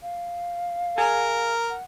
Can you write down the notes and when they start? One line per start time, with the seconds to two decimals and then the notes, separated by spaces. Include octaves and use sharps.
0.02 F5
0.98 G#4 A#4
1.70 F#5